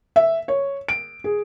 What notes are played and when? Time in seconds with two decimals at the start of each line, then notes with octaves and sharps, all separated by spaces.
0.16 E5
0.48 C#5
0.88 D7
1.24 G#4